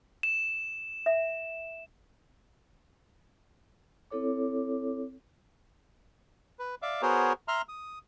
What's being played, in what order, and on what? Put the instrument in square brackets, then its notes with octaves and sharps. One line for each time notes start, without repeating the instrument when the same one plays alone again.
[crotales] E7
[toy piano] E5
[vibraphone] C4 E4 A4 C#5 D6
[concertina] B4
D5 E5 F5
B3 F#4 G#4 A#4 C5 C#5
E5 A#5 C6 F6
D#6